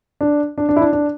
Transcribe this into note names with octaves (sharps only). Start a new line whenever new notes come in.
D4
D4
D4
E4
D4
D4